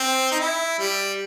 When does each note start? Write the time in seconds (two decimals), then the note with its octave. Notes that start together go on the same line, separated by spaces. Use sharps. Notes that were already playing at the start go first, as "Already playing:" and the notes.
Already playing: C4
0.31 D#4
0.40 E4
0.79 G3